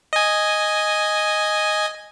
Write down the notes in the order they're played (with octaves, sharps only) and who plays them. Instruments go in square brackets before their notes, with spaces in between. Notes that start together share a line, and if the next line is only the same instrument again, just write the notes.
[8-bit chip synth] D#5 G#5